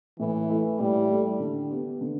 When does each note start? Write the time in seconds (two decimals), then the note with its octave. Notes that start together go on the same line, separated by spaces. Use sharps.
0.19 A2 E3
0.49 A3 E4 A4
0.79 A2 G3
1.09 A3 E4 A4
1.40 D3
1.71 B3 G4
2.01 D3